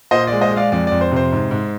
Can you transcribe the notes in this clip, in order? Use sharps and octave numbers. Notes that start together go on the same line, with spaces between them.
A#2 C5 D#5
G#3 D5
C5 D#5
G#3
D5 F5
F2 D5
F2 D5
C5
C3 C5
G#2
G#2